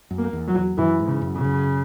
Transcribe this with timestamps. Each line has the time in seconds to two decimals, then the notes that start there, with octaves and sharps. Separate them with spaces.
0.11 F#2
0.19 A#3
0.33 E2
0.48 F#3
0.55 E2
0.78 F#2 E3
1.00 G#2
1.07 C#3
1.22 F#2
1.36 C#3
1.44 F#2